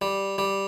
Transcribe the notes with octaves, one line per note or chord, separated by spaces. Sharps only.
G3
G3